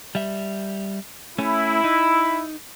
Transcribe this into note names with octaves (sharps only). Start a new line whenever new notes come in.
G3 E5
A3 C#4 E4
D#4